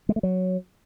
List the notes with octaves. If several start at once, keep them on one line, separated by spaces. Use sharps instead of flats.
G#3
A3
F#3